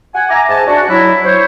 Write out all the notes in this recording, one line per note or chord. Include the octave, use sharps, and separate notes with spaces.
F#5 G#5
E5 G#5 A#5 D6
G#2 G#5 A5
D4 F#4
F#3 E4
C5 C#5